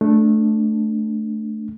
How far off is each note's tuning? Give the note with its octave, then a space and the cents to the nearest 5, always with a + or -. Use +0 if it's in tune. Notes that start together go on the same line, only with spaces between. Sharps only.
A3 -5 D4 +0